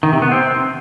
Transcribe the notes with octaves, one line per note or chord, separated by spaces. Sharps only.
D#3
C3
B3
C4